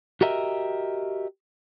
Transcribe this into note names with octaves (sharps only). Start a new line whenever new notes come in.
F#4 G4 A#4 D#5 E5